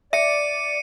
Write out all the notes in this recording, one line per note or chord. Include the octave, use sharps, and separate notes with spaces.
D5 E5 C#7 D#7